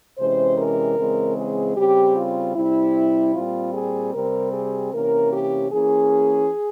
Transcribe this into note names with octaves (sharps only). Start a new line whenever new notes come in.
C3 E3 G#3 C#4 C5
A#4
C#3 E3 G#3 C4
G#4
C#3 G3 C4 G4
F4
C3 G3 C4 E4
A#2 G3 C4 F4
G#4
C3 G3 C4 A#4
G#4
C3 E3 A#3 C#4 A#4
G4
E3 A#3 C#4 G#4